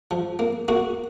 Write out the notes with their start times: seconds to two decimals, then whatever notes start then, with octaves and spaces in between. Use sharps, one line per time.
0.11 F3
0.39 A#3
0.68 A#3 F#4